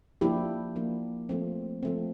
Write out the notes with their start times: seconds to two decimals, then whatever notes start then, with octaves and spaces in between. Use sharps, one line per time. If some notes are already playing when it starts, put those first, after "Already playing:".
0.21 F3 A#3 D4 E4 G4
0.76 F3 A#3 D4
1.29 F3 A3 C4
1.83 F3 A3 C4